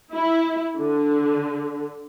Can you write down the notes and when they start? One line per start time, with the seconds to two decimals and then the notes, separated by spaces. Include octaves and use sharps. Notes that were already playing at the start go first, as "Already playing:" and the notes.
0.14 E4
0.80 D3